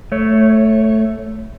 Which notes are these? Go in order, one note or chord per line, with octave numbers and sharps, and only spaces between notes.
A3 C#5